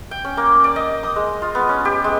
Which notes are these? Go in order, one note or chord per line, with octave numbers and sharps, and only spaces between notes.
G5
C#4
A#3
D5
D#5
D#6
G#3
F4
B3
C#4
G4
G#3